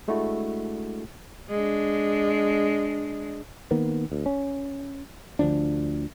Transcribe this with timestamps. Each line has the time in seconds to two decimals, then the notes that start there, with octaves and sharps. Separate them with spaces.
0.08 G#3 A3 D4 E4 F#4
1.50 G#3 D4
3.71 D#3 A#3 B3
4.12 D2
4.26 C#4
5.39 D2 D3 F3 D4